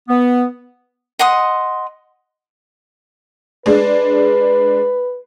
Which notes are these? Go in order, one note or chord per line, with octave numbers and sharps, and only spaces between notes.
B3
D#5 F#5 C6 D#6
G#3 D4 B4